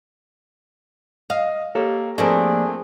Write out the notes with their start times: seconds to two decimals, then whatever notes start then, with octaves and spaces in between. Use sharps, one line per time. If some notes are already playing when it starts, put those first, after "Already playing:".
1.30 D#5 F5
1.75 A#3 G4 A4 C#5
2.18 F3 A3 A#3 C4 D4 G#4